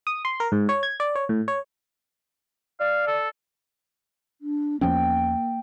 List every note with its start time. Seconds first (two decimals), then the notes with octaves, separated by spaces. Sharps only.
0.07 D#6
0.25 C6
0.40 A#4
0.52 G#2
0.69 C#5
0.83 G#6
1.00 D5
1.15 C#5
1.29 A2
1.48 C#5
2.80 D5 F5
3.07 A4
4.42 D4
4.81 E2 F3 A#3 C#4 G5